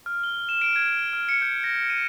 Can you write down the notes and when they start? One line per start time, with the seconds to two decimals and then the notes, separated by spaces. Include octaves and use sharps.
0.06 F6
0.24 G7
0.49 E7
0.61 D7
0.76 G#6
0.97 G7
1.13 F6
1.29 C#7
1.42 G6
1.64 A#6
1.90 D#7